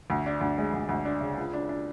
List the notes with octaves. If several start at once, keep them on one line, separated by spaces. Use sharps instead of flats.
D2
D4
D2
G#3
D2
D2
D4
C#3
C#2
D4
D4